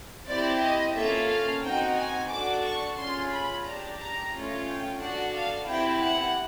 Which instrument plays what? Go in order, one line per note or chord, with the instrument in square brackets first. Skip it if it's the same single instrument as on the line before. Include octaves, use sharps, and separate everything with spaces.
[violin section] C4 E4 G4 D5
D#5
A#3 C#4 F4 A4 E5
F5
C4 D#4 F#4 G5
G#5
D4 F#4 A4 D6
C#6
C#4 F4 G#4 C6
B5
D4 G4 A#5
A#5
A3 C#4 F4
G5
D4 F#4 A4 F#5
F5
C4 E4 G4 G5
F#5